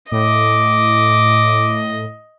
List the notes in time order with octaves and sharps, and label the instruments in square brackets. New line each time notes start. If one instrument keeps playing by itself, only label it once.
[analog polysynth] A2 [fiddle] D#5 [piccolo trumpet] D6